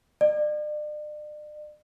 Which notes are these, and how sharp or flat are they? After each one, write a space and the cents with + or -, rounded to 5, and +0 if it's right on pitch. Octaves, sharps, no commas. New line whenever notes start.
D5 +40